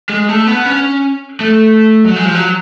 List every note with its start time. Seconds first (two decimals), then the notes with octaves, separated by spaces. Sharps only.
0.09 G#3
0.29 A3
0.47 B3
0.66 C#4
1.41 A3
2.04 F#3
2.16 G#3
2.25 F3
2.34 F#3